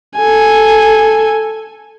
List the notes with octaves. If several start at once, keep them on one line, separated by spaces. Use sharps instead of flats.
A4 G#5